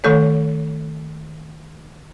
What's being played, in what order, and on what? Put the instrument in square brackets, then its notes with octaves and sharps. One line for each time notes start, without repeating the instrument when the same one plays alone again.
[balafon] D#3 A3 A4 C#5